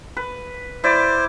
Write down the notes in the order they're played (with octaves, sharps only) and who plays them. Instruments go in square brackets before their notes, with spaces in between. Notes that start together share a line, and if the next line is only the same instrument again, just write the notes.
[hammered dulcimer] B4
[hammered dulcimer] E4 D5 [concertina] C5